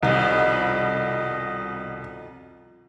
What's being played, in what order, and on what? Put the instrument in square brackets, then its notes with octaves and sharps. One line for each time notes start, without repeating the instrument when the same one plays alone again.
[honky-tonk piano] C2 [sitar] F2 B2 D#3 [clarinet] D#5